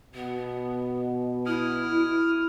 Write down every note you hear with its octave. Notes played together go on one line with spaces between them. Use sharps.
B2 B3
E4 D#6 F6